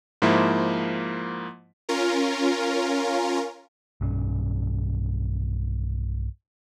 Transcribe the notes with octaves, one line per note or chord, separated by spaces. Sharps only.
G#2 F3 A#3 E4
C#4 F4 A#4
B1 G2 C#4